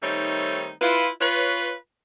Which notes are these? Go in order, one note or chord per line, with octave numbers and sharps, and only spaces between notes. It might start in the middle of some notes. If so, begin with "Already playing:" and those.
D#3 G3 A3 C4 D#4 C#5
E4 F4 B4
F4 B4 C#5